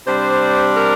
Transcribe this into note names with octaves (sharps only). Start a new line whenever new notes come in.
C3 G3 D4 C5
A#4